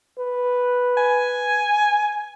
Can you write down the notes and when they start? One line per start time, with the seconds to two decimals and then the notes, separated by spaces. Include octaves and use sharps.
0.19 B4
0.97 G#5